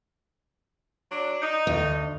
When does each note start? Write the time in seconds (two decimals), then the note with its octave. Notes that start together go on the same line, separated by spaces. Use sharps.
1.12 F#3 D4
1.42 D#4
1.67 D2